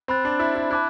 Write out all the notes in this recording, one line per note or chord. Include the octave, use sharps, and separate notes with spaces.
C4 B5 F#6 A6
D4
E4
E4
E4 A5 D6 F#6